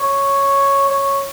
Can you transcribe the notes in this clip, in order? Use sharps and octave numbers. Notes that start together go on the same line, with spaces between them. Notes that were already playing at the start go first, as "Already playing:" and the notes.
Already playing: C#5
C#5